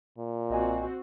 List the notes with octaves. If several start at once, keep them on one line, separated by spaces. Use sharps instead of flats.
A#2
B1 C4 F#4 D#5 G#5